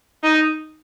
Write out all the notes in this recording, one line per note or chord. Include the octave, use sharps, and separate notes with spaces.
D#4